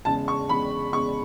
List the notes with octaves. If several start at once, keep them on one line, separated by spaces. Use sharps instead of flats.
E2 C#3 G#3 A5
C#6
E2 C#3 G#3 B5
E2 C#3 G#3 C#6